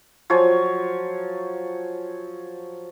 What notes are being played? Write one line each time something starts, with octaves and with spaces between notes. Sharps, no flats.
F3 F#3 C#5 G#5